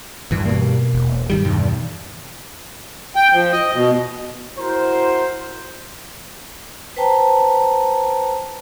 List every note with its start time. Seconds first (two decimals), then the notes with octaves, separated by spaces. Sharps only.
0.31 D#1 G2 E3
0.45 B2 A#3
0.94 E1
1.30 G2 D#3 G3
1.45 E2 G2 B2 D#3
3.16 G5
3.33 F3
3.52 D#5
3.73 B2
4.58 E4 F#4 A#4 C5
6.97 B4 C5 G5 A5 A#5